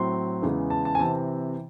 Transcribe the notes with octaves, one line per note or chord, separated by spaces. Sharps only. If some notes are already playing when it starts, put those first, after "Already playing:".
Already playing: A2 F#3 C4 C6
E2 C#3 E3 G#3
A5
A5
G#5
C3 E3 C4 A5